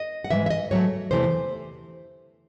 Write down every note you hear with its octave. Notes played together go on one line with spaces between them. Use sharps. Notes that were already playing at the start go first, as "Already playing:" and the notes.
Already playing: D#5
F#5
G#2 E3 G#3 E5
E5
D#5
G#2 F#3 A3 C#5
E2 C3 E3 A3 C5